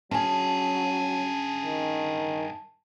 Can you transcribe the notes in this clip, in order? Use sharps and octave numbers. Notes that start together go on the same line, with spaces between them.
G2 F#3 C#4 G#4 G#5 A5
D#3